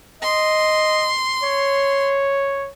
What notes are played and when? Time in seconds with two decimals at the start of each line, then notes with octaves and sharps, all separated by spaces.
0.22 D#5 C6
1.44 C#5